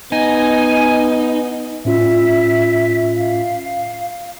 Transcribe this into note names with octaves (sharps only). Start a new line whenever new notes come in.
B3 D#4 G#5
A2 C#4 F4 E5
F5